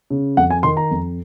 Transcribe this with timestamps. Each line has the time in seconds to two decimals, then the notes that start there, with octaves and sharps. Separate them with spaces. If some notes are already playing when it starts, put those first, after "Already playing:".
0.10 C#3
0.37 F2 F#5
0.50 G#5
0.63 D#3 C6
0.77 A#5
0.91 F2